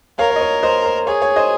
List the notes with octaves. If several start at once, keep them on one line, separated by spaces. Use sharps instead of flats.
A#4 C#5 F5
C#5
D#5
C#5
C5 D#5
C5
G#4 C#5
C#5
C5 D#5